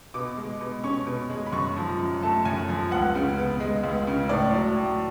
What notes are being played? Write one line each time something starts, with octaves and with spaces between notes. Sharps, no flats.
B2 D6
G#3
B2
C#4 C#6
B2
G#3
B5
F#2 C#6
F3
F#2
A3 A5
F#2 G#5
F3
C#2 F#5
C#3
B3
G#3
C#2
C#3
A2 D5
F#3
A2